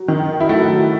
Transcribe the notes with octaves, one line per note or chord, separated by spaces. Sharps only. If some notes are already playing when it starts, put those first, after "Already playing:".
Already playing: F#3
D#3
E4
F#3 A3 F#4